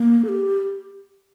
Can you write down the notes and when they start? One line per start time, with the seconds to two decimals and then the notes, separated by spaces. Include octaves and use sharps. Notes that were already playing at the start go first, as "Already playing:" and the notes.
Already playing: A#3
0.25 A4
0.28 G4